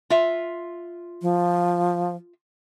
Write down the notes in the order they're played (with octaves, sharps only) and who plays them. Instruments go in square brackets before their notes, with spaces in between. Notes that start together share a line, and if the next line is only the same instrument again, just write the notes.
[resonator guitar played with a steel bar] F4 E5
[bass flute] F3